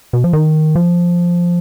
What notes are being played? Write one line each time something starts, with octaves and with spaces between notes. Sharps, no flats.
B2
F3
D#3
F3